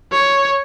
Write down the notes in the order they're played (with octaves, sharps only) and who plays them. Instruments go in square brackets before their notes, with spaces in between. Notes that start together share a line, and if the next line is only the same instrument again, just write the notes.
[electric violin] C#5